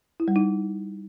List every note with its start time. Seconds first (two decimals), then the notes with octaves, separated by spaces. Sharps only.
0.20 E4
0.28 G3
0.36 D#4